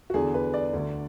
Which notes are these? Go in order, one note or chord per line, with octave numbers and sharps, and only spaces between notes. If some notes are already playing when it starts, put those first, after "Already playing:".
F#4
E2 D3 G#4
B4
D5
D2 D3